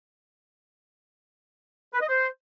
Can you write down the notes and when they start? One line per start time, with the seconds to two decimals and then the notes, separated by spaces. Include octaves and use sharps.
1.93 B4
2.01 D#5
2.09 C5